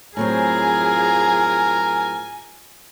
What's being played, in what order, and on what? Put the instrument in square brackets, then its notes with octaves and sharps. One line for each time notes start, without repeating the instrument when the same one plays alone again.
[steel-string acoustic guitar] A2 F#3 C4 [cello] F4 G#4 [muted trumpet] A#4 [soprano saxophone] G#5